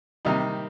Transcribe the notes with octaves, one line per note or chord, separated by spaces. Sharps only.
C3 D#3 G3 A#3 D#4